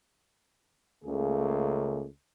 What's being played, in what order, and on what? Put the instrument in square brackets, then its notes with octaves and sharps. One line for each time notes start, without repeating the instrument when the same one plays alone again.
[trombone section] C#2 C#3 A3 A#3 G#4